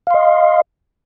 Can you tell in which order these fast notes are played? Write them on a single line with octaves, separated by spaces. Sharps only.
F5 C6 D#5